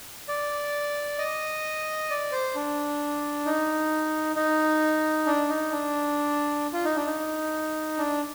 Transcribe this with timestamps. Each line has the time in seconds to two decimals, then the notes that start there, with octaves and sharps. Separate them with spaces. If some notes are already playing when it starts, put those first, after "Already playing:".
0.28 D5
1.19 D#5
2.10 D5
2.32 C5
2.55 D4
3.46 D#4
4.36 D#4
5.26 D4
5.49 D#4
5.72 D4
6.73 F4
6.85 D#4
6.96 D4
7.07 D#4
7.98 D4